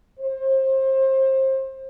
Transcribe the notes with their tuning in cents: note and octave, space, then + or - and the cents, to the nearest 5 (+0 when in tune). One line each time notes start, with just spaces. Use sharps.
C5 +30